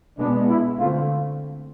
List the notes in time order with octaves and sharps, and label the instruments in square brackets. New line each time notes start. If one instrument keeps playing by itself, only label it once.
[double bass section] B2 G#3 B3 [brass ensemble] D4
[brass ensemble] E4
[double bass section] D3 A3 C4 [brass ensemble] F4